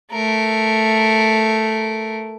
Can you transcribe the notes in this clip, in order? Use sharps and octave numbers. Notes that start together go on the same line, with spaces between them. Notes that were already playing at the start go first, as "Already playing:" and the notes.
A3 A#4